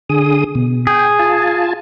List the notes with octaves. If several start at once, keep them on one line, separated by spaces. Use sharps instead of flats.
D3 G#4 D#6
B2
G#4 G5
F4 G#5 A5